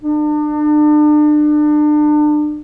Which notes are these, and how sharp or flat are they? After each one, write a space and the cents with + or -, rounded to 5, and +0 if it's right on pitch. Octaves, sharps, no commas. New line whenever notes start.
D4 +35